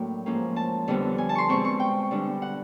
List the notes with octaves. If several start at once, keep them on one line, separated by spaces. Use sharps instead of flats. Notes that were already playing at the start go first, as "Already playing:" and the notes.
Already playing: A2 F#3 A#3 D4 G5
G#2 F3 A#3 C#4
A5
F2 D3 G3 B3
G#5
A5
C6 C#6
B2 G#3 C4 C#6
C#6
G5
D3 G3 B3 D4
F#5